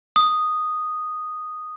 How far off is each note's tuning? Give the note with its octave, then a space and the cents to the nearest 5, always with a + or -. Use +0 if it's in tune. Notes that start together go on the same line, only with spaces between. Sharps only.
D#6 -5